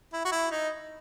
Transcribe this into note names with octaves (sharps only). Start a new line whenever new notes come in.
E4
F#4
E4
D#4